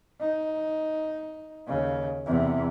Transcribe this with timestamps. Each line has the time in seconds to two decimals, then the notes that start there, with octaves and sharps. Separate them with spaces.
0.21 D#4
1.67 D#2 C#3
2.26 E2 C3